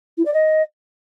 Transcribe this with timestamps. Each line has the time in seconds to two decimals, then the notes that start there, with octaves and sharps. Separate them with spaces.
0.17 E4
0.25 D5
0.34 D#5